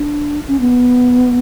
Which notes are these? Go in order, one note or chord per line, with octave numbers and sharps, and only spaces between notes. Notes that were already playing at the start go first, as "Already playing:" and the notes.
Already playing: D4
C#4
B3